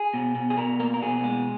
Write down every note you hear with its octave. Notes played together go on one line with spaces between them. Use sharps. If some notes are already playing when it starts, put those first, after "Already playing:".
Already playing: G#4
B2
B2
G#4
B2 A#4
A#3 A#4
A#4
B2 G#4
G#3